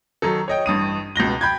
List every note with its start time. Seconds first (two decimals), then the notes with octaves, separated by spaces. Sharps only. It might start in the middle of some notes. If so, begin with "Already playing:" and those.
0.22 D#3 F#3 D#4 A4
0.48 C#5 D#5 G5
0.66 A1 G2 D#6 D#7
1.16 C#2 B2 A#6 G7
1.41 G5 B5 G6 G#6